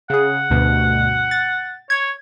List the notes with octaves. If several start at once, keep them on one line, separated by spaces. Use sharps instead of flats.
C#3 G#4 F#5
D2 G2 B2
A6
C#5 G#6